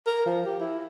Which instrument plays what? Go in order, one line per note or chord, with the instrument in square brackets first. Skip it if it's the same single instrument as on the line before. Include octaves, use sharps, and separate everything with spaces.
[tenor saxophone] A#4
F3
G4
E4